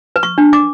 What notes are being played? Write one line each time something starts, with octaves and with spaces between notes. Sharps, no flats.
B4
C#6
D4
D6